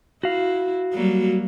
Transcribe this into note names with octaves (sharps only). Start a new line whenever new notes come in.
E4 F#4 F5
F#3 G3 A#3